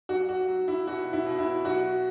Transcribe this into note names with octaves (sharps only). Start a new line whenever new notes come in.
F#3 F#4
F#4
F#3
E4
B2 F#4
E4
B2
E4
F#3 F#4